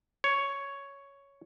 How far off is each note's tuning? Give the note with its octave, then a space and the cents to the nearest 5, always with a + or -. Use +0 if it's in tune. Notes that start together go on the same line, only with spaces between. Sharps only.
C#5 +5